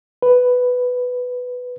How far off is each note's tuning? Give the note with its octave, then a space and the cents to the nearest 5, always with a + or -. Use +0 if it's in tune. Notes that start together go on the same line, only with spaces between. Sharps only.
B4 +5